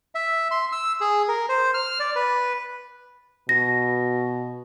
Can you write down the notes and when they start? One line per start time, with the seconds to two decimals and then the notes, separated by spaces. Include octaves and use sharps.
0.15 E5
0.51 C6
0.72 E6
1.01 G#4
1.28 A#4
1.49 C5
1.74 F6
2.00 D5
2.16 B4
3.49 B2 A#6